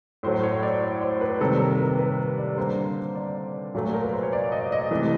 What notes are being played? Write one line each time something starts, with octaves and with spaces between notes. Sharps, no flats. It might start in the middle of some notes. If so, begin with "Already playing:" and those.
A2 F#3 A3 C5
C#5
D5
C5
B4
C3 D#3 G3 A#3 A4
A#4
A#4
B4
B4
D5
D3 G3 A#3 C5
D5
A#2 F#3 A3
A#4
B4
C5
C#5
D5
D#5
D#5
C3 E3 A3